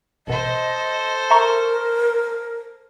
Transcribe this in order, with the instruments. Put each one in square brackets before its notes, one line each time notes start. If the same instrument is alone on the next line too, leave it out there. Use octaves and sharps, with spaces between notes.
[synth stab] A1 B2 [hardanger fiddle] A4 C5 [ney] D#5
[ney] A#4 [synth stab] E5 A#5 C#6